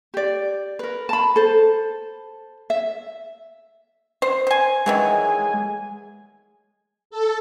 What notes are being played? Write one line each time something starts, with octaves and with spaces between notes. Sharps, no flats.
G4 D5
A#4 B4
A5 B5
A4 C5
E5
C5
C5 G#5
D#3 E3 F#3 G#3 G#5
A4